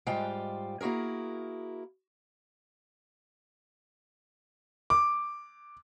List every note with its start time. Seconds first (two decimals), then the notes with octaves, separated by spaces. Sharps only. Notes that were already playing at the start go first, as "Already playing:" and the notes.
0.07 G#2 G3 G#3 F4 F5 G5
0.81 A#3 E4 F#4 G#4 A#4
4.90 D6